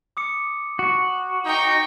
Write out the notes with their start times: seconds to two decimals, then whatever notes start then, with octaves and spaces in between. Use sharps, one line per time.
0.17 D6 D#6 C#7
0.79 F#4
1.45 D#4 G5 C#6